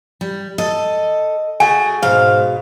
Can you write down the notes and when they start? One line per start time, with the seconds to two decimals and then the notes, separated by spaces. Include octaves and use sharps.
0.21 G3
0.58 A4 D#5
1.60 A3 F#4 G#4 G#5
2.02 G#2 B2 G#3 F5